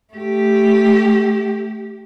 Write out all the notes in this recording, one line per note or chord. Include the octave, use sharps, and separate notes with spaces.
A3 G4